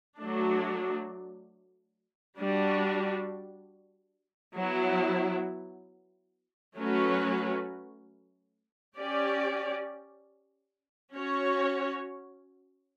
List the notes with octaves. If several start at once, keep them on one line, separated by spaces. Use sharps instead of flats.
F#3 A3 D4
G3 D4 F#4
F#3 B3 E4
F#3 A3 C#4 F#4 B4
C#4 G4 D5
C#4 F#4 C#5